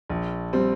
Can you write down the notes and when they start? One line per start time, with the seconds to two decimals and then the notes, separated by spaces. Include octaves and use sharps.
0.10 A#1
0.53 G3 C4